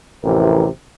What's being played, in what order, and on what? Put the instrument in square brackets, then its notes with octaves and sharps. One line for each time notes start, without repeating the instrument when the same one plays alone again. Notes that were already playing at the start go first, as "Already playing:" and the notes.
[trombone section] A1 F2 C3 E3 A#4